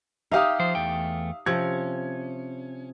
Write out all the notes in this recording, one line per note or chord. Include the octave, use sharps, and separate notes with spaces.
D#4 G4 E5 F5 D#6
F3 C5
E2 A3 G5
C3 F3 C#4 G#6